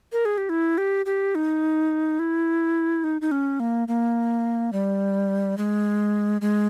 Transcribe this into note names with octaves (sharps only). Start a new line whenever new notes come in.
A#4
G#4
G4
E4
G4
G4
D#4
E4
D#4
D#4
C#4
A#3
A#3
G3
G#3
G#3